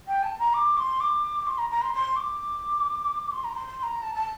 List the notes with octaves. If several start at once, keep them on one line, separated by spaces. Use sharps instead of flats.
G5
A5
A#5
D6
C6
D6
C6
A#5
A#5
C6
C6
D6
C6
A#5
C6
C6
C6
A#5
A5
A5